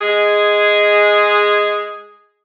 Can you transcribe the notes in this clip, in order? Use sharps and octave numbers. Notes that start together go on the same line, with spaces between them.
G#3 G#4